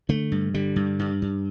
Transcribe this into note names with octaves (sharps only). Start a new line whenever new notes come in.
D3 A3
G2
D3 G3
G2
G2
G2